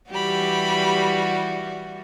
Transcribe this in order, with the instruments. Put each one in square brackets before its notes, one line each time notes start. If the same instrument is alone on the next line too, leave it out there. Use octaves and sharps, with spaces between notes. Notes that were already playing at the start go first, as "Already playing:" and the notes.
[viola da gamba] E3 G3 F#4 [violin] G4 B5